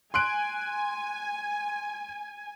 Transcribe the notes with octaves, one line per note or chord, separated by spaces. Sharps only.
G#5 C6 F#6 D7